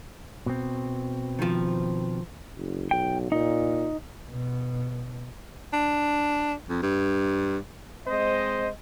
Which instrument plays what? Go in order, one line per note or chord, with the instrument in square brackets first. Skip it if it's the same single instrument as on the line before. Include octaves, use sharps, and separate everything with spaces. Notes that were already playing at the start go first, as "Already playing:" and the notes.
[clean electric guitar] B2 C4
[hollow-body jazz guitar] D#3 F3
[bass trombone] F#1
[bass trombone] B1 [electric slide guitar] G5
[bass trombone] A#2 [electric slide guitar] D#4
[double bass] B2
[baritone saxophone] D4
F2
G2
[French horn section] G#3 C4 D#5 [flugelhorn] C5